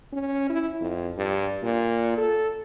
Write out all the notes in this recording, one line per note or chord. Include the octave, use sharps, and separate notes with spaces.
C#4
E4
F2
G2
A#2
A4